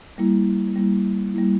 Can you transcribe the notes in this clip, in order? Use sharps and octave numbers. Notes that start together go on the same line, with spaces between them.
G3 A#3 E4
G3 A#3 E4
G3 A#3 E4